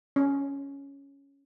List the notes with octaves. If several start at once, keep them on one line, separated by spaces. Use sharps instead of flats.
C#4